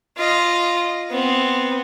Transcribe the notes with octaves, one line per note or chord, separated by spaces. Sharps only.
F4 D#5
B3 C4